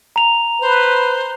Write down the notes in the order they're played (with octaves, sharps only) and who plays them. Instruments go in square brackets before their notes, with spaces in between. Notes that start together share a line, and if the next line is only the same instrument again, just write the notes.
[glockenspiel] A#5 F7
[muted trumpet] B4 [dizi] C5